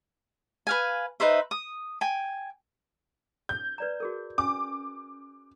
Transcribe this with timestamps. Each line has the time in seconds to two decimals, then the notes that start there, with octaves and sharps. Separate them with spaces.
0.67 B4 F5 G#5
1.20 D#4 B4 C5 E5
1.51 D#6
2.01 G5 G#5
3.49 G6
3.78 B4 D5 A#5
4.00 F#4 G#4 A#4
4.38 C#4 G#5 D6